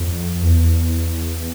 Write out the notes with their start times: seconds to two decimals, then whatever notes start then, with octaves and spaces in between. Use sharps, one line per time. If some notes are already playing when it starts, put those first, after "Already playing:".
Already playing: F2
0.41 E2